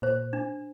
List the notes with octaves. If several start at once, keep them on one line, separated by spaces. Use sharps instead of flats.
A#2 C5
D4